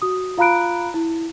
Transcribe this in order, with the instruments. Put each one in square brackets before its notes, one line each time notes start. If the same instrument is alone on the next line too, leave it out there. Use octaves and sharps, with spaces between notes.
[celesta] F#4 D#6
F4 F5 A#5 B5 F#6 D7
E4